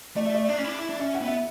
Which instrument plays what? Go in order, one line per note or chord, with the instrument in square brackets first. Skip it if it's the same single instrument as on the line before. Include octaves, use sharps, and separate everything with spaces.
[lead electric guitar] A3 [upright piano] D5
[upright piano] E5
D5
[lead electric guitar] D4
C#4
E4
D4
E4
D4
[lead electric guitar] C#4 [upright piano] E5
[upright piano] F#5
[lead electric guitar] B3
[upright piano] E5